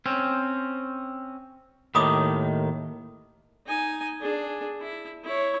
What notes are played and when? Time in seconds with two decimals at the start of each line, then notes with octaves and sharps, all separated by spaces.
0.06 C4 C#4
1.95 D#2 A2 D#3 B5 D6 D#6
3.67 D#4 G#5
4.21 D4 G#4
4.81 E4
5.25 E4 C#5